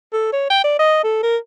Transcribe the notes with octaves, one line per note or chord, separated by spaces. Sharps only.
A4
C#5
G5
D5
D#5
A4
A#4